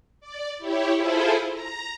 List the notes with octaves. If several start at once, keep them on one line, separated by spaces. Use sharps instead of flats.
D5
E4 G4 C#5
E4 F4 G#4 A4 C5
A#5